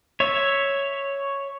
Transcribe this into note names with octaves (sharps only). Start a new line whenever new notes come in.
C#5 E5